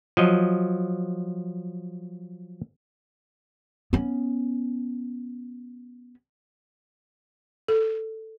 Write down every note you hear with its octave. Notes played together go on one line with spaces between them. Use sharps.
F3 F#3 D#5
B3 C#4
A4